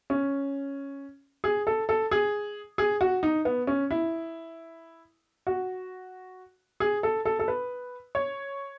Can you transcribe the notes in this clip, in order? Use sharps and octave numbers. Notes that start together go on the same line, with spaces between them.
C#4
G#4
A4
A4
G#4
G#4
F#4
D#4
B3
C#4
E4
F#4
G#4
A4
A4
A4
B4
C#5